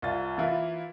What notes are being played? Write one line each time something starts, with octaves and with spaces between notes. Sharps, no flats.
C2 F4 A6
E3 A#3 E4 F4